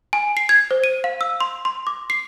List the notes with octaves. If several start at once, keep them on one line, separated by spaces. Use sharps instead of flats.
G#5
C7
G#6
C5
D#7
F5
E6
C6
C6
D6
C7